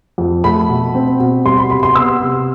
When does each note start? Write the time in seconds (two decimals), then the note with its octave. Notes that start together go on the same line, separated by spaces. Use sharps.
0.18 F2
0.44 A3 B5
0.69 B2
0.95 C4
1.20 B2
1.45 G3 C6
1.58 B5
1.70 C3 B5
1.83 C6
1.95 B3 E6
2.21 C3